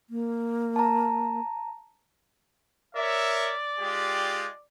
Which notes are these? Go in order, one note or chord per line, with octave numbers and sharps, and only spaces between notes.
A#3
A5 A#5
A#4 C#5 D5 E5
G#3 F4 G4